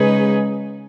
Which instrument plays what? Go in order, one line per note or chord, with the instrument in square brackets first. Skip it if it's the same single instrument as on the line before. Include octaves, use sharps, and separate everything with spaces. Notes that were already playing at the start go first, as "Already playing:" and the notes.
Already playing: [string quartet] C#3 G#3 D#4 G#4 B4